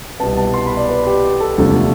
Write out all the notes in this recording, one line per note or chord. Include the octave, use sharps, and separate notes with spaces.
C2 B2 B3 A5
A5
C6
B5
D5
B4
G4
A4
E1 D2 C3 F3 A3 A4